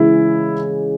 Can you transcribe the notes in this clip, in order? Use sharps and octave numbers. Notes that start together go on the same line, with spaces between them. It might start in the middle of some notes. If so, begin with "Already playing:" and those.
Already playing: C#3 E3 G#3 E4